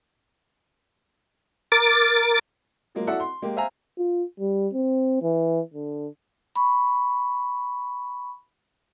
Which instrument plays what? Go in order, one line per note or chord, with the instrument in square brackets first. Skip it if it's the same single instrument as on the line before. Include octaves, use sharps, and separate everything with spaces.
[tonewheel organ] A#4 D6 A6
[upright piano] F3 F#3 G#3 A#3
E4 F#4 A4 D5 E5 F#5
C6
G#3 A#3 G4
C5 E5 F5 G#5 A#5
[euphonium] F4
G3
C4
E3
D3
[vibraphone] B5 C#6